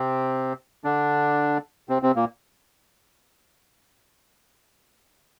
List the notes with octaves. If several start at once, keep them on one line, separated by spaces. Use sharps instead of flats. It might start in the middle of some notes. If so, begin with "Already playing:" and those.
Already playing: C3 C4
D3 D4
C3 C4
C3 C4
A#2 A#3